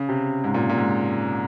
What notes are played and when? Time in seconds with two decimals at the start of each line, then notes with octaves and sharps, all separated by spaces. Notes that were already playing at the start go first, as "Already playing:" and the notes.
Already playing: C#3
0.09 C3
0.44 G#2
0.54 A#2
0.69 A#2
0.77 G#2